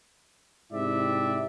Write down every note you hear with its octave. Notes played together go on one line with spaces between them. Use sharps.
G#2 C3 E4 G4 D5 E5